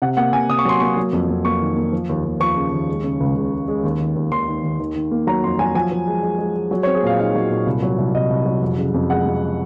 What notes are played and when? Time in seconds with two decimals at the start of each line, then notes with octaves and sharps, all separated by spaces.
0.02 C3 F#5
0.17 A#3 F#5
0.33 C3 G#5
0.49 C3 D#6
0.59 C#6
0.65 F#3 C6
0.80 A#3 C#6
0.97 F#3
1.13 F2
1.29 F2
1.45 A#3 C#6
1.61 D#3
1.77 A#3
1.93 F3
2.09 D#2
2.25 D#2
2.40 F3 C#6
2.56 C#3
2.73 D#2
2.89 G#3
3.04 C#3
3.20 C#2
3.36 C#2
3.52 G#3
3.68 G#3
3.83 D#2
4.00 D#3
4.16 D#2
4.32 D#2 C6
4.47 D#3
4.63 D#2
4.79 D#3
4.95 D#3
5.11 A#3
5.27 F#3 A#5
5.44 F2 C6
5.59 F#3 G#5
5.75 F3 G#5
5.91 F3
6.07 G#3
6.23 G#3
6.38 G#3
6.55 G#3
6.71 F#3
6.83 C#5
6.86 C4
6.95 G#4
7.03 A#2 F5
7.19 D#4 F5
7.35 F#3
7.50 A#2
7.67 C2
7.82 F#3
7.98 C2
8.14 C2 D#5
8.30 C2
8.46 F#3
8.62 F2
8.77 C#3
8.94 F2
9.10 G#3 F#5
9.26 F2